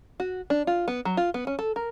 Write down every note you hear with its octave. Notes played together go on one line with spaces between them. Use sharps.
F#4
D4
F4
B3
F#3
F4
B3
C#4
A4
A#4